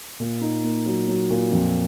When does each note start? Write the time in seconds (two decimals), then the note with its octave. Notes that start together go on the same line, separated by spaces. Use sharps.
0.20 A#2
0.41 D#4
0.64 A#3
0.86 F#3
1.08 F#3
1.30 A#2
1.52 F2